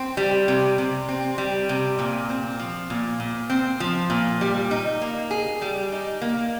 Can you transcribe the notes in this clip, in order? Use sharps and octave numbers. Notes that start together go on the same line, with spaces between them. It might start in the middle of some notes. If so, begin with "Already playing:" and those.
Already playing: C4
G3
C3
C3
C4
G3
C3
A#2
C4
F3
A#2
A#2
C4
F3
A#2
G3
D#4
A#3
G#4
G3
D#4
A#3